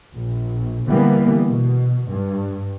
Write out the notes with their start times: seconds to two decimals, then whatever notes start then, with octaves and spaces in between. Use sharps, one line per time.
0.16 A#1
0.90 D3 E3 G3 A#3 B3
1.50 B2
2.11 G2